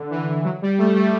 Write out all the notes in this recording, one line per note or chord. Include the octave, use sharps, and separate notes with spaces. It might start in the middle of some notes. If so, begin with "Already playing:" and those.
Already playing: D3
E3
E3
F#3
G3
A3
G3